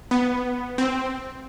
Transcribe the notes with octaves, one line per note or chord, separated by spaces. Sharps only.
B3
C4